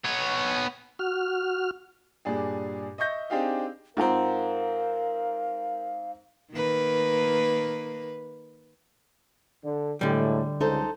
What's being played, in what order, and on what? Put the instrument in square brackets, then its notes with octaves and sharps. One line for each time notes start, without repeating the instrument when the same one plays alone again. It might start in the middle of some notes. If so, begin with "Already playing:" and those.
[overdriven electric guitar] B3 C#5
[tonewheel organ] F#4 F6
[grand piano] G2 A#2 D4 G#4
D#5 E5 C#6 G6 A#6
C4 D4 D#4 G4 G#4 F5
[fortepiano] G#2 C4 [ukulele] F4 F#5 A#5 [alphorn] A#4 [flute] F5
[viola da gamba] D#3 A#3 B4
[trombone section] D3
[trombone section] A2 G#3 [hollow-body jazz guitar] D3 G3
[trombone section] C#2 [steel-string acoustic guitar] D#4 A4 C5